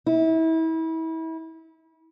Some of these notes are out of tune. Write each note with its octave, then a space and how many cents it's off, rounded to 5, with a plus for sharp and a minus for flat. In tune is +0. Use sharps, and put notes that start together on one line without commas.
E4 -30